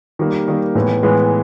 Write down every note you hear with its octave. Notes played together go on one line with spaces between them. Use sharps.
D#3 G3 A#3
D#3 G3 A#3
A2 E3 G#3 B3
A2 E3 G#3 B3